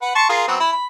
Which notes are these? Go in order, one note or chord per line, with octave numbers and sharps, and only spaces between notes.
B4 F#5
A5 C6 C#6
F4 G#4 A#4
F#3 B3 C4
E4 B5
B5